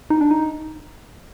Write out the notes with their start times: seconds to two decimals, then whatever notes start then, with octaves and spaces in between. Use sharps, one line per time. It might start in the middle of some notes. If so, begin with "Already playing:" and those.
0.10 D#4
0.21 D4
0.31 D#4